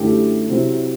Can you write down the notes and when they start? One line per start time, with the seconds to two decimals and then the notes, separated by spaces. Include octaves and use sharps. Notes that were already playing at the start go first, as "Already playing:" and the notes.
Already playing: F#2 D3 A3 E4 G4
0.48 C3 F#3 C4 E4